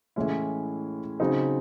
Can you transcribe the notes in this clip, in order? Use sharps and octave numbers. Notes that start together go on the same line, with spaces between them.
A2 E3 G#3 C#4 E4
C#3 F#3 C4 D#4